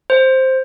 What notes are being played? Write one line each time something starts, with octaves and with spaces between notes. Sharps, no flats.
C5